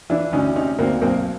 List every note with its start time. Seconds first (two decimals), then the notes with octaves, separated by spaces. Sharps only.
0.10 E3 D4 E4
0.33 D2 C#4 D#4
0.56 C3 C#4 D#4
0.78 D2 A#3 C4
1.02 B1 A#3 C4